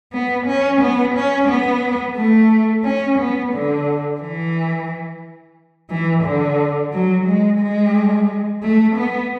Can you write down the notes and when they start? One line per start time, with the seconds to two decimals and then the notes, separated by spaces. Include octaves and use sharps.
0.13 B3
0.46 C#4
0.81 B3
1.14 C#4
1.49 B3
2.16 A3
2.84 C#4
3.19 B3
3.52 D3
4.20 E3
5.90 E3
6.24 D3
6.93 F#3
7.26 G#3
7.60 G#3
8.62 A3
8.96 B3